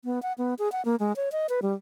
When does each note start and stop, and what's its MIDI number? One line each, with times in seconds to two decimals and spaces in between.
0.05 0.22 59
0.22 0.33 78
0.38 0.54 59
0.59 0.71 68
0.72 0.84 78
0.85 0.96 58
1.00 1.15 56
1.16 1.29 73
1.32 1.47 75
1.49 1.60 71
1.62 1.74 55